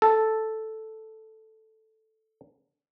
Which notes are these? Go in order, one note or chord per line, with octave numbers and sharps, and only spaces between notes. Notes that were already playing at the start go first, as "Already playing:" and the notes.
A4 A5